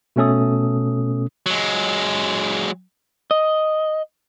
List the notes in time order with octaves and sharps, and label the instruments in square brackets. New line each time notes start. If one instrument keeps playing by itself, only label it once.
[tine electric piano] B2 A3 C#4 A4 D#6
[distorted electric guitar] F#3 G#3
[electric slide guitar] D#5